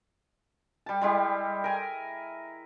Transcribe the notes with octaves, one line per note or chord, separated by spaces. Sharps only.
G3 A5
G3 G#3 E4 G4
A#4 G#5